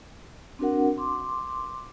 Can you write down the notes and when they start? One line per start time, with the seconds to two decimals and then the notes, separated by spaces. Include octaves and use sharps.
0.59 C4 D4 F#4 A#4 F#5
0.98 C6 D6